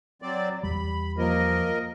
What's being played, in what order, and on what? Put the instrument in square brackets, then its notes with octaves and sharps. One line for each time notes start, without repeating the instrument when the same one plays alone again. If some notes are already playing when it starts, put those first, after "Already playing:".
[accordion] F#3 C4 D5
[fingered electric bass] E2 G3 [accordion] B5
[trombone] F3 [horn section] A#3 [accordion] A#4 D#5